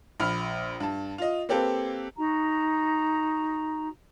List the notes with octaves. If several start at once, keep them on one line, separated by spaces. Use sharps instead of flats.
A#1 B5 F6
G2 A5
F4 D#5
A#3 C4 G4 A4 B4
D#4 F#4 A#5